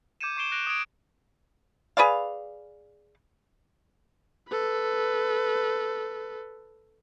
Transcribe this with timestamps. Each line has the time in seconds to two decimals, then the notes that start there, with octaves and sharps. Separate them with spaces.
0.21 D6 G6 G#6 C#7 D#7 E7
0.37 C#6 D6 C7 D7 E7 G7
0.52 F#6 A#6 D7 F7 G7
0.67 D#6 G6 G#6 D7
1.97 G#4 B4 D5 F5
4.48 A4 B4